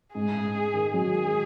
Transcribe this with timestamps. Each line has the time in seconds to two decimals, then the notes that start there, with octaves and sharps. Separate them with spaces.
0.15 G#2 G#4
0.35 G#2
0.54 G#2
0.74 D#3
0.94 F#3 G#4
1.14 D#3